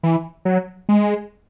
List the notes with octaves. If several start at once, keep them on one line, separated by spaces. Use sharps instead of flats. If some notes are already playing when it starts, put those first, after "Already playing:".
E3
F#3
G#3